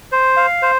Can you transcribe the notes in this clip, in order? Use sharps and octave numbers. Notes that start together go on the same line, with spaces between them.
C5
F5
C5